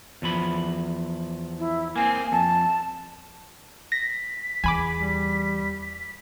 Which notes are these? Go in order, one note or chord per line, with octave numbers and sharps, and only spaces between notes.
E2 F3 B5
E4
A#3 C4 G#5
F2 A5
A#6 B6
E2 G#5 B5 D6
G3